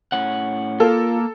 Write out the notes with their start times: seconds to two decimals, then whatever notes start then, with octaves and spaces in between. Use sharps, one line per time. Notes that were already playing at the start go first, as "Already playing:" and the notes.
0.12 A2 C#4 F#5
0.80 A#3 F4 A4